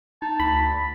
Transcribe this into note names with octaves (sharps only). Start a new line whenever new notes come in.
D#4 A5
D2 B5